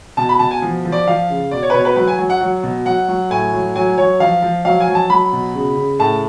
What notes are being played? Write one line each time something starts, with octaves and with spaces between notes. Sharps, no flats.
B2 A5
B5
B2 A5
G#5
F3
F3
D5
F3 F5
C#3
B2 D5
C#5
B4
B2 C#5
B4
F#3 B4
G#5
F#3
F#5
F#3
B2
F#3 F#5
F#3
A2 G#5
F#3
F#3 G#5
F#3 C#5
F3 F5
F3
F#3 F5
G#5
F#3
A5
F#3 B5
B2
C#3
C#3
A2 A5